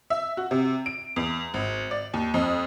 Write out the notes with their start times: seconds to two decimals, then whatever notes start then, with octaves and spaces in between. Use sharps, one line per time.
0.10 E5
0.37 F#4
0.51 C3
0.86 D7
1.16 E2
1.54 G#1
1.91 D5
2.14 D#2
2.34 F2